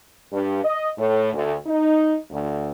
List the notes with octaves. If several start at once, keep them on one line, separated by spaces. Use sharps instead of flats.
G2
D#5
A2
D2
D#4
D2